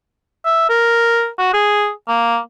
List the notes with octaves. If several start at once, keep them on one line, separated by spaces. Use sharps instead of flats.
E5
A#4
F#4
G#4
A#3